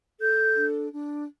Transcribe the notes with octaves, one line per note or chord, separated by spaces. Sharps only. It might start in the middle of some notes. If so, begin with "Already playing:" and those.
A4 G6
D4
D4